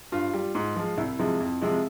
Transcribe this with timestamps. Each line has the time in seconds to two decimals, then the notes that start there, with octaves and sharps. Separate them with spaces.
0.12 G2 F4
0.34 G3
0.55 G#2
0.76 F3 G#3
0.97 C2 E4
1.19 C3 F3 G#3
1.40 F2
1.61 C3 F3 G#3